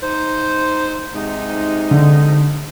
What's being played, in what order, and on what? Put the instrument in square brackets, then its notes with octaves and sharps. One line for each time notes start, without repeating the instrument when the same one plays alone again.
[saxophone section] D#4 C5
G#2 C3 D#4
[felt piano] D3